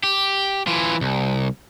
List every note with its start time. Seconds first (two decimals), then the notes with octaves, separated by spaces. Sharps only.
0.03 G4
0.67 E3 F4
1.01 C2